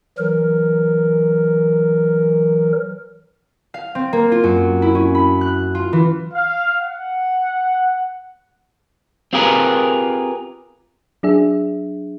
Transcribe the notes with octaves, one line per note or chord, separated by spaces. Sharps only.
E3 F#3 A#4
F5
C4
A#3
F4
F#2
E4
C#4
B5
F#6
F4
E3
F5
F#5
C4 F4 G4 G#4 A#4 B4
F#3 D4 G#4 E5